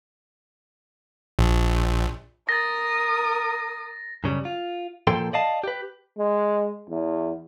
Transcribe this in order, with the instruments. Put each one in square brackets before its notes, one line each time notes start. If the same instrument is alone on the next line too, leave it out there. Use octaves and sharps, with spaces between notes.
[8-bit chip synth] A#1
[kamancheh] A#4 D#6 [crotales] A6 A#6
[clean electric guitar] F#2 C#3 G3
F4
A#2 F3 A4 G5 C6
D5 D#5 F5 A5
G4 B4
[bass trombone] G#3
E2